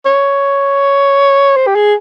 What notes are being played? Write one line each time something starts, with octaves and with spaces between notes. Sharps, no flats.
C#5
C5
G4
G#4